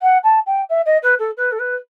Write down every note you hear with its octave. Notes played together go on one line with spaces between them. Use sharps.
F#5
A5
G5
E5
D#5
B4
A4
B4
A4
B4